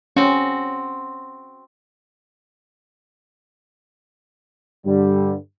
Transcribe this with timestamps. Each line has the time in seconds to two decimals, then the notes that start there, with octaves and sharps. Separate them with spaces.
0.16 C4 C#4 F#4
4.86 G2 D3 G3